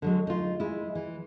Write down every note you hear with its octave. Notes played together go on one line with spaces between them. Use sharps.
D3 F#3 G#3
D#4 F4
G#3 E4
E3